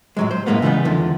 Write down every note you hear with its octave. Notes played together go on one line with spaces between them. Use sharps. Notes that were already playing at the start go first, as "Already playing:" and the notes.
A2 F#3 G#3
C5
F#2 A2 C3 G#3 A#3 B3
C#3 E3 G3 G#3 B3
E2 D3 D#3 F3